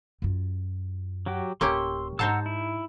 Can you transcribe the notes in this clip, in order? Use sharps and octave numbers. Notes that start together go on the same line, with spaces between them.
F#2 F4
F#3 F#4 G4
D1 A#3 C#4 G4 C6 E6
G#2 D#4 C5 F#5 A5 A#5 E6
E4